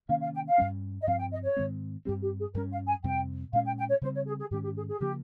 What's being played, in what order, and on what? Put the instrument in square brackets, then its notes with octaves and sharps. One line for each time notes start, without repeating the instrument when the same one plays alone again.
[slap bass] C3 D#3 A#3 C#4 [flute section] F5
[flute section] F5
G5
F5
[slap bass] G2 G3 C#4
[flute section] D#5
[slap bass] G2 F3 C4 [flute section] F5
[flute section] G5
D#5
C#5
[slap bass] G#2 D#3 G#3 C4
[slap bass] G2 G3 C4 [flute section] G4
[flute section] G4
G#4
[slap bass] G2 G3 C#4 [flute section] A#4
[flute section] F5
G#5
[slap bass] F2 C3 G3 C4 [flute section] G5
[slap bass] A#2 G#3 C#4 [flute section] F5
[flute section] G5
G5
C#5
[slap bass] C#3 G3 C4 [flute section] C5
[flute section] C#5
G#4
G#4
[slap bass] G#2 D#3 G#3 C#4 [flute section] G4
[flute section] G4
G#4
G#4
[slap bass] C#3 F3 A#3 [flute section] G4